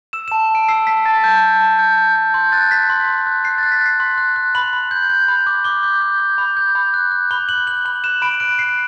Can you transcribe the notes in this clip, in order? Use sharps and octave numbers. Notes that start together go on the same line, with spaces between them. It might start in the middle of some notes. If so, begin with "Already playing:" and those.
E6 E7
A5 E7
A5 D7
E6 C7
A5 B6
A5 A6
A5 G6
A5
A5
G6
G6
G6
C6 G6
F#6 A6
F#6 B6
C6
C6
F#6
F#6 C7
F#6 A6
B6
F#6 C7
C6
F#6
F#6
B5 F#7
B5
G6
G6
B5
D6
D6 G7
G6
G6
G6
B5
G6
B5
F#6
F#6
B5 G7
F#6 F#7
F#6 F#7
B5 F#7
F#6 E7
B5 D7
F#6 D7
F#6 C7